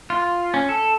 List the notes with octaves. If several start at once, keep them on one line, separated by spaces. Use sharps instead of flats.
F4
C#4
A4